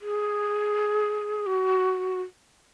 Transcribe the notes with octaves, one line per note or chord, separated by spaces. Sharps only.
G#4
F#4